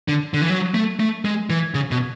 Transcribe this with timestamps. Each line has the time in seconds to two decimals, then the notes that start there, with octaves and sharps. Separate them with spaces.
0.08 D3
0.34 D3
0.42 E3
0.49 F#3
0.74 A3
1.00 A3
1.25 G#3
1.50 E3
1.74 C#3
1.91 B2